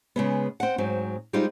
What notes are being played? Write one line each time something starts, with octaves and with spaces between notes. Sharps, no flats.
C#3 G#3 B3
C4 F#5
G#2 F#3 C4
G3 G#3 C4 D#4 F4